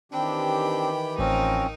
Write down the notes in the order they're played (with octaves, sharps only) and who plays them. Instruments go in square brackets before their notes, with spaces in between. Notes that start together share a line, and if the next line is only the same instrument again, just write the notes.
[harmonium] D#3 E3 G4 [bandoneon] C4 D4 [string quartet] G5 B5
[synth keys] A1 [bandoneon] F3 C4 C#4 [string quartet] D#4 A#4